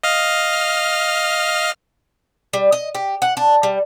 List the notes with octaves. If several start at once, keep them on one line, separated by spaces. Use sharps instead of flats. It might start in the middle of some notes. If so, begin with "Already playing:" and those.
D#5 F5 F6
G3
D#5
G4
F#5
D4
G3